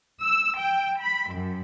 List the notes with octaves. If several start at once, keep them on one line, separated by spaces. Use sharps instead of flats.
E6
G5
B5
F#2